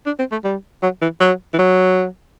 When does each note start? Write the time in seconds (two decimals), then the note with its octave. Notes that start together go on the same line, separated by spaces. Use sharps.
0.06 D4
0.19 C4
0.32 A3
0.44 G3
0.82 F#3
1.01 E3
1.20 F#3
1.53 E3
1.59 F#3